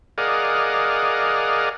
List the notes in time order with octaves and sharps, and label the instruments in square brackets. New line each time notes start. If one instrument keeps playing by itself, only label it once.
[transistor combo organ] G#4 A#4 D5 D#5 F5 F#5